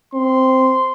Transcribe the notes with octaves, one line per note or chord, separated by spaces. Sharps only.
C4 C6